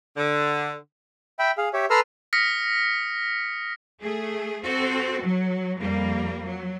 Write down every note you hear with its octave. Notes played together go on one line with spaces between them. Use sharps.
D3
E5 G5 B5
G#4 F5
G4 C#5 E5
A4 B4 A#5 C6 E6 F6
D#6 F6 A#6 B6 C#7
A3 G#4
C4 F#4 A4
F#3
F2 G3 A#3
F#3